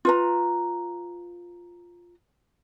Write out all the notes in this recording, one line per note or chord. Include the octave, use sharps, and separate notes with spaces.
F4 B4 A#5